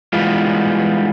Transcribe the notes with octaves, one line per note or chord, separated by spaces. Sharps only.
E3 G3 G#3 B3 F4